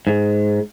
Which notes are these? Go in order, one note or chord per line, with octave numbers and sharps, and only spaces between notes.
G#2